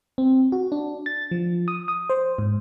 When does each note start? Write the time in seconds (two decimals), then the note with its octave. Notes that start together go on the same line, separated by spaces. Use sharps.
0.18 C4
0.52 F#4
0.72 D4
1.06 A6
1.31 F3
1.68 D#6
1.88 D#6
2.10 C5
2.38 G#2